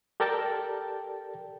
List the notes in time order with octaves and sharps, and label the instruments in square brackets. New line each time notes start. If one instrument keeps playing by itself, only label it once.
[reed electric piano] G4 A4 A#4 D5 G5 A5